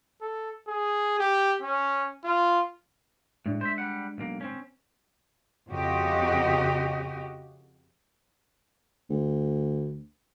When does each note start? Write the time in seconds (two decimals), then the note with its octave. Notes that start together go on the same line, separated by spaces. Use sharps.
0.21 A4
0.68 G#4
1.19 G4
1.61 C#4
2.24 F4
3.46 A2 G#3 D4
3.61 C5 E5
3.78 G3 F#5
4.18 B1 A#3
4.41 C4 C#4
5.70 F2 C#3 F#4 G4 D#5
9.10 D2